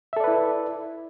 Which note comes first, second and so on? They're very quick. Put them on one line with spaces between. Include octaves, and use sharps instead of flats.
E5 A4 D5 B4 E4